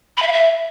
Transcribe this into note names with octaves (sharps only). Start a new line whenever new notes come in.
B5
E5
F5
E5